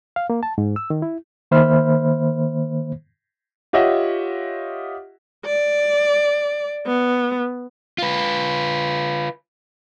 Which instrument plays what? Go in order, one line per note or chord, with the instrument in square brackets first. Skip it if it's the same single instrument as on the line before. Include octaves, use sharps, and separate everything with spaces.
[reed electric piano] F5
A#3
A5
G#2
E6
D#3
E4
D#3 A#3 C5 E5 B5 F6
[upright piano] F4 G4 C#5 D#5 E5 F#5
[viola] D5
B3
[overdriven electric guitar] F4 B4